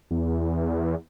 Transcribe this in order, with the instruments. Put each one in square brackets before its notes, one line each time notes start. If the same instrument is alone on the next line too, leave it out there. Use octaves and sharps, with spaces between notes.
[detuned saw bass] E2